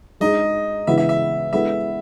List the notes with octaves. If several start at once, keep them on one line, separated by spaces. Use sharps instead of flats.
G#3 D#4 G#4 D#5
C#3 E3 G#3 B3 E4 E5
E5
E5
G#3 B3 E4 A4 E5